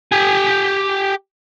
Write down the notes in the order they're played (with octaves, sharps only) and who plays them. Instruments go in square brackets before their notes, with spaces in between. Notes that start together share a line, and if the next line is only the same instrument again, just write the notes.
[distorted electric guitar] G4 G#5